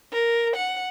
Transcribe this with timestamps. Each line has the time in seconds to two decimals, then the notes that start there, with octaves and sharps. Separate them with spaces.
0.12 A#4
0.56 F#5